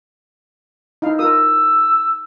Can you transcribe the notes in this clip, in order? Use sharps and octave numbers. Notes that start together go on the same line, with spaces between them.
D#4 E4 F5
F4 A#4 D#6 E6